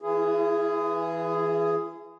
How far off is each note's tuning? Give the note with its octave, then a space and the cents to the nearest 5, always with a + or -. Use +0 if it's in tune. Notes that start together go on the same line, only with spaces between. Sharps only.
E3 +0 E4 +45 G#4 +0